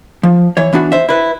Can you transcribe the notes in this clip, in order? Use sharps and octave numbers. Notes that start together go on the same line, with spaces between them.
F3
E3 C#5
E3 B3 D4 F#4
C5 E5
E4 B4